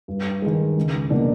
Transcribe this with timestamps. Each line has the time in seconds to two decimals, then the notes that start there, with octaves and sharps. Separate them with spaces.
0.08 G2
0.42 D#3 G#3
0.77 C#2
1.10 B2 F#3 A#3 D4